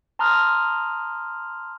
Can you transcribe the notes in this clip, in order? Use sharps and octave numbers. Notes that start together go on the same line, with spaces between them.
A5 A#5 C6 D#6 F6 F#6